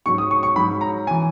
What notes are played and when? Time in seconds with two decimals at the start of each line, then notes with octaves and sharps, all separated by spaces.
0.06 G#2 F#3 C#6
0.18 D#6
0.31 C#6
0.43 C#6
0.56 G#2 F#3 B5
0.81 A#5
1.07 G#5
1.11 E3